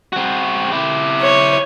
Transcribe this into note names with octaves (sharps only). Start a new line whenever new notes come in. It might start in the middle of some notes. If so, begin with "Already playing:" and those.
C4 F#4
E4 G4
C#5